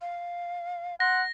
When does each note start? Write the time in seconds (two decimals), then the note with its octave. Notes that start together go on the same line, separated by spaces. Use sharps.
0.01 F5
1.00 F#5 C6 A#6